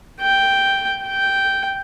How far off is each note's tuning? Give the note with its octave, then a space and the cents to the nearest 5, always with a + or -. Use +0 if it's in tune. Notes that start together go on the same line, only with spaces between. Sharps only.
G5 +0
G5 -5